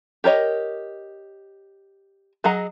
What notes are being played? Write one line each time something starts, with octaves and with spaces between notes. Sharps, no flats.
G4 A#4 C#5 D#5
F#3 G#4 D#5 F#5 A#5